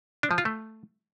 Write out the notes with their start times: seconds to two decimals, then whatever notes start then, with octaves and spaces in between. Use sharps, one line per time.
0.23 D4
0.31 F3
0.38 F4
0.45 A3